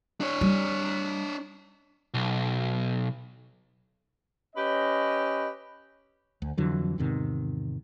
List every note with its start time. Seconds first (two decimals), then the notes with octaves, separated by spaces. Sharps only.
0.21 D4 C#5
0.41 G3
2.14 B1
4.56 C#4 G4 B4 D#5
6.42 D2
6.57 F2 D3 E3 F#3
6.98 E2 G#2 C3 D#3